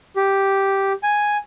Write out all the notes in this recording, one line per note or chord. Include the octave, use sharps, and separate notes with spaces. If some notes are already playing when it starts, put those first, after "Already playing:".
G4
G#5